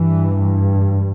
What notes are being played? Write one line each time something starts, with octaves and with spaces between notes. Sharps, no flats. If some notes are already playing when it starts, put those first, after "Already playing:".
Already playing: G2 E3